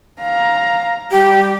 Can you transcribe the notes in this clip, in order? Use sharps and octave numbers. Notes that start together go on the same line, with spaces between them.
F5 A#5
G3 G4